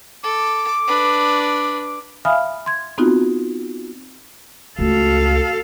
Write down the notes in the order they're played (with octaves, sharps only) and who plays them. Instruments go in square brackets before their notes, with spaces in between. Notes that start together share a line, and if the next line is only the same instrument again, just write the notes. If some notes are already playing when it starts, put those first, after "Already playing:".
[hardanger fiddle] A4 [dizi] D6
[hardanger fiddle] D4 B4
[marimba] E5 F5 G#5 B5 D#6 F6
C6 G#6
B3 C4 D#4 F4 F#4
[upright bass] C#2 A3 [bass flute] F#4 [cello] A4 F5